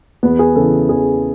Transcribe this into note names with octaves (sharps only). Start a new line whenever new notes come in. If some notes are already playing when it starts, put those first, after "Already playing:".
E2 B3
G#4
C#3 E3 A4
E2 G#4